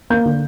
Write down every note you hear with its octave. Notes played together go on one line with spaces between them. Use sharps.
A#3 G6
D3